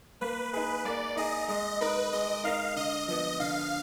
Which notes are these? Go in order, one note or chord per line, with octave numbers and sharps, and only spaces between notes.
A#3 B4
D#4 G#4 B4
A#3 D5
D#4 G#4 D#5
G#3 D#5
D#4 A#4 B4 D#5
G#3 D#5
D#4 A#4 D#5 F5
D3 D#5
F3 B3 D#5
D3 F5